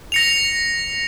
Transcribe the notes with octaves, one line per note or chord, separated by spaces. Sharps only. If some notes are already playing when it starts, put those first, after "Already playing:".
A#6 C#7 F7